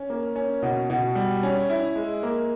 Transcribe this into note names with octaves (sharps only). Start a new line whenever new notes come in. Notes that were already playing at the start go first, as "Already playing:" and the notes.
Already playing: C#4
A#3
C#4
B2
B2
G3
C#4
E4
G#3
A#3